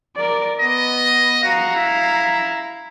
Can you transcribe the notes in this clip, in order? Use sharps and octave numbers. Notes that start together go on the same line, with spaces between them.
A#4 D5
B3 D#5
F#4 F5 A#5
E4